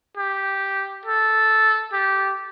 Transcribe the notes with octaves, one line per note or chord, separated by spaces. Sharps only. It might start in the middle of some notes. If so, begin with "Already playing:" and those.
G4
A4
G4